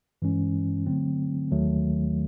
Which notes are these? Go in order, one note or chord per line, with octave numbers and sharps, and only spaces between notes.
G2 E3 G#3 C#4
D3 F#3 A3 C4
D#2 D#3 F#3 A3